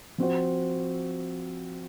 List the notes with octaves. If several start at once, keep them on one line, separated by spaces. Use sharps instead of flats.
F3 C4 F#4 C5